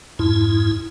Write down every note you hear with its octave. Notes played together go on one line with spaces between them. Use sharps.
F2 G#2 E4